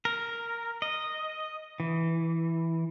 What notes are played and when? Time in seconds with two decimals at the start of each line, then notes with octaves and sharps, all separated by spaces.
0.05 A#4
0.82 D#5
1.80 E3